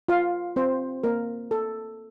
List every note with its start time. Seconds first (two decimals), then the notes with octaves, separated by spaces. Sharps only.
0.08 F4 F5
0.56 C4 F4 C5
1.04 A#3 A#4
1.51 A4